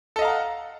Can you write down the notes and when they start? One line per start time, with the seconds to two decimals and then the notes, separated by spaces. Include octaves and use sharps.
0.16 A4
0.19 D#5
0.22 F5
0.25 A#5
0.28 F#5